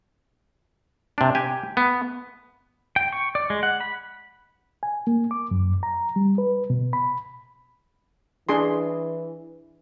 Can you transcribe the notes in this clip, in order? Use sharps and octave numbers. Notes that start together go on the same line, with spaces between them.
C3 D4
G4 G#5
B3
G5
C#6
D5
G#3
F#5
B5
G#5
A#3
D6
F#2
A#5
G3
B4
B2
B5
E3 D4 G#4 C6